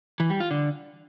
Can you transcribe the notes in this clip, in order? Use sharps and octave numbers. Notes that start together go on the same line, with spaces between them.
E3
G3
F4
D3